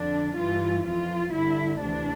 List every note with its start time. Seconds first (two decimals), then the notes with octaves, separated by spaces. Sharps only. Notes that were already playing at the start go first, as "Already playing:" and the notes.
Already playing: F2 D3 D4
0.36 G2 E3 F4
0.84 F2 E3 F4
1.32 G2 D3 E4
1.79 D2 C3 E3 D4